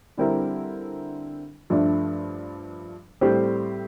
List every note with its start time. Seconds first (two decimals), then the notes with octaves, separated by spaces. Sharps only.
0.18 D3 G3 C4 E4 A#4
1.70 G2 F3 A3 D4
3.21 A2 G3 C4 G4 C5